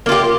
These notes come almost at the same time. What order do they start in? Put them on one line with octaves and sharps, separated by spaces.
A#3 F4 G4